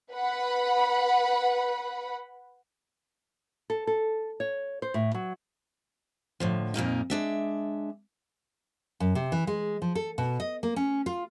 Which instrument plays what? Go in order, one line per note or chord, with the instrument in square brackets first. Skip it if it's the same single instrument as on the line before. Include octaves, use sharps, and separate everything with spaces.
[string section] B4 F#5 B5
[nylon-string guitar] A4
A4
C#5
C5
A2
F#3
[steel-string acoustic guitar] A2 D3 F3
F2 A#2 A#3 D#4
G#3 D4 E5
[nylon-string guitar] F#2
C3
E3
G#3
F3
A4
B2
D#5
A#3
C#4
F4